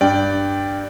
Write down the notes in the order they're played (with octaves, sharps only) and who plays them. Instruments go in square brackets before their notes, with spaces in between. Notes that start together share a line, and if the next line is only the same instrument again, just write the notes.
[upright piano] G2 [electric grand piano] D5 G5